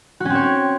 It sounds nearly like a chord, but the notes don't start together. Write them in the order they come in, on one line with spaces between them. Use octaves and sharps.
F#4 C#4 C4 C#5